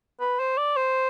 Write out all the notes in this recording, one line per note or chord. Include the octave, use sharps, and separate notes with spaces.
B4
C5
D5
C5